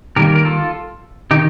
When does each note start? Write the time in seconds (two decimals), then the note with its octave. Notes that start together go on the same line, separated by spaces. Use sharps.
0.16 D#3 G3 A#3 G4 A#4
0.35 A#4
0.45 F4 A4
1.31 D#3 D#4 G4